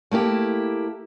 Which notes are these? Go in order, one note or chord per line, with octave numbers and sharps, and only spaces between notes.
A3 A#3 E4 G4